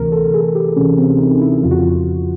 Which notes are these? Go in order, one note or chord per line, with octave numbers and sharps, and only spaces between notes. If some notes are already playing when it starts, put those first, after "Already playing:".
Already playing: D2 C3 E3 A#4
A4
G#4
G4
D2 C3 E3 C#4
C4
D#4
E4
F2 C#3 F3 F4
F#4
F4